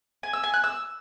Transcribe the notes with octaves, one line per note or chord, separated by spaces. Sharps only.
G#5
E6
G#5
F#6
E6